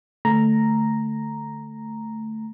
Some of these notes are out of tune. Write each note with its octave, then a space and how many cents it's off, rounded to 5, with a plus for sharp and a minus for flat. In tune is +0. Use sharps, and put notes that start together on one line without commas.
D3 +0 A3 +0 A#5 +0